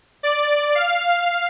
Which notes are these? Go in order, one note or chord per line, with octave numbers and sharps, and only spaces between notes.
D5
F5